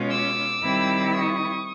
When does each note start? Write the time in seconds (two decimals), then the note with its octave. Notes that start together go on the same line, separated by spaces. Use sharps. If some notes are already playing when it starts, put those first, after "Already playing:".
Already playing: B2 G#3 C#4 F4
0.11 D6 E6
0.63 D#3 G3 C4 E4
1.15 C#6 D#6